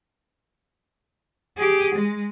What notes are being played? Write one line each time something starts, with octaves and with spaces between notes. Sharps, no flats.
G4 G#4
G#3